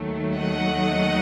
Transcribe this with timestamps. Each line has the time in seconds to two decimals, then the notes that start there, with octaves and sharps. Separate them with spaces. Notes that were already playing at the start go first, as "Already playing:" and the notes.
Already playing: D#2 D#3 F#3 A3
0.34 D#5 F#5